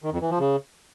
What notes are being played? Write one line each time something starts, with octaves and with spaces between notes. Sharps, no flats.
D#3
F2
E3
F3
C#3